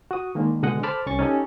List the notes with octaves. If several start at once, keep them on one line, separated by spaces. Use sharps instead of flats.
F#4 D#6
D#3 G#3 A#3 D4
B2 D3 G#3 D#5 F#5
A4 C5 A5 B5 D6 F6
C2 C#4 C#6 A6
C#4 D#4 G4 A4